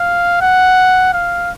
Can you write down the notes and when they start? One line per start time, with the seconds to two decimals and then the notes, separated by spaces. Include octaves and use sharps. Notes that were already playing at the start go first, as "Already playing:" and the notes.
Already playing: F5
0.41 F#5
1.13 F5